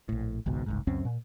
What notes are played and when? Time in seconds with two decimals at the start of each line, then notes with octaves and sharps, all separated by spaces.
0.09 A#1 A2
0.46 G#1 C#2 G#2 B2
0.66 F#1 C2 G#2
0.87 C#2 F#2 C4 C#4
1.05 A#2